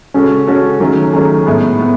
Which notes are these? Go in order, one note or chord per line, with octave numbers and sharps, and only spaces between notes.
C#3 G#3 C#4 F#4 A4
C#3 G#3 C#4 F#4 A4
D#3 F#3 A3 C#4 G#4
D#3 F#3 A3 C#4 G#4
A2 G#3 B3
B3